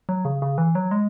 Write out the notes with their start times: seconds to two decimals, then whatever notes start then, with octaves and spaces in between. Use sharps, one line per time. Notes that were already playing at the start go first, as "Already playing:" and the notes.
0.09 F#3
0.25 C#3
0.42 C#3
0.58 E3
0.75 F#3
0.91 G#3